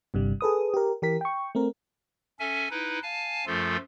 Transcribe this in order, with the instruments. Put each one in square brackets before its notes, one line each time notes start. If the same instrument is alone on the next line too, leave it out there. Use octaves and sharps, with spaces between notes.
[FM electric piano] G1 G2 C3 G3
G#4 A4 B4 D#6
G4 A#4
E3 G4 A#4 B6
G5 C#6
A3 C4 A#4
[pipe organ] C#4 A4 E5 G#5
D#4 E4 B4
F5 G#5 A5
F#2 F3 A3 F4 A4